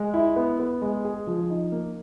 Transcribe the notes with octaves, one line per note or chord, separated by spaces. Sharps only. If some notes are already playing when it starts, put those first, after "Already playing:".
Already playing: G#3
E4
B3
B3
G#3
G#4
F3
D#4
A#3